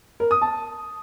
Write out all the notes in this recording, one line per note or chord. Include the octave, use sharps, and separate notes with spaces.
A#4
D#6
A5